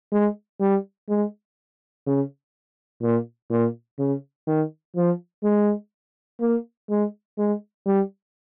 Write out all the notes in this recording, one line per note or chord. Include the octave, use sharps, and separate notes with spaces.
G#3
G3
G#3
C#3
A#2
A#2
C#3
D#3
F3
G#3
A#3
G#3
G#3
G3